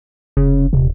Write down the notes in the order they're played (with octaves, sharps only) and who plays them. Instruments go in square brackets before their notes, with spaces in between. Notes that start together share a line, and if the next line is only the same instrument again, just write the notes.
[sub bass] F1 [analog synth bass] C#3
[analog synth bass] D#1 [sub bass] C3